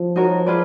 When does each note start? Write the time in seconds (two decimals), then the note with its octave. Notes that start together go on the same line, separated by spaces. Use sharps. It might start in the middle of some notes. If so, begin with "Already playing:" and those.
Already playing: F3
0.16 D#4 F#4 A#4 C#5
0.46 F4 G#4 B4 D5